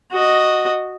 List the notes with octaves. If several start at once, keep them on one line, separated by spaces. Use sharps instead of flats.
F#4 D#5